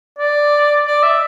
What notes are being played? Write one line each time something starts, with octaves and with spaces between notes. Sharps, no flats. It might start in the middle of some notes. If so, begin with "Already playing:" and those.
D5
D5
E5